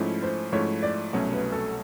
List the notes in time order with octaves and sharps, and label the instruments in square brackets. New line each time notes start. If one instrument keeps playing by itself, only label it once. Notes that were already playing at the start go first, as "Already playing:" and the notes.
Already playing: [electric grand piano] G#2 F3 A3 C#4 E4
[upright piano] C5
[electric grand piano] G#2 F3 A3 C#4 E4 [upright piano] C#5
[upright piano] D5
[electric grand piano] C2 B2 F#3 A3 C#4
[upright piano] B4
A4